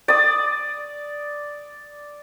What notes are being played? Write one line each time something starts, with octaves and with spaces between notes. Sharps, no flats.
D5 D#6